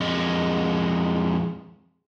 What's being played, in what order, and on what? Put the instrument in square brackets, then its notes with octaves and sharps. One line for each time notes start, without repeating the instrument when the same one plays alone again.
[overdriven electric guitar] F2 G#3